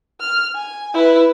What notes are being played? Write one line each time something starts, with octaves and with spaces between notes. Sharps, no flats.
F6
G#5
E4 B4